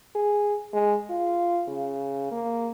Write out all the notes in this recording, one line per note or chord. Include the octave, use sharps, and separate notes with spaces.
G#4
G#3
F4
C#3
A#3